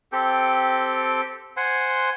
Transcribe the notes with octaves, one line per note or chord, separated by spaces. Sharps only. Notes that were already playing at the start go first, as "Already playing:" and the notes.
C4 G4 A4 G5
C5 F#5 G#5 C6